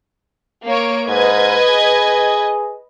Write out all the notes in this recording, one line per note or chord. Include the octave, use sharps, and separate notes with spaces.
A#3 C#5 D7
G#2 B4 D#5 G#6
G#4